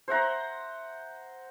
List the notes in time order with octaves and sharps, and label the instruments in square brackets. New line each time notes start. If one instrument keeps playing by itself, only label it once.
[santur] C5 E5 F#5 A#5